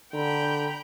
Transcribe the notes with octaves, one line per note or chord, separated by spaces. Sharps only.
D3 G5 A#5 B5